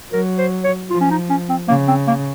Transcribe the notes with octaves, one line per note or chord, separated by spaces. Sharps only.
F#3 A#4
C5
C#5
F3 F4
C#4
D#4
C#4
C4
C#3 A#3
C4
A#3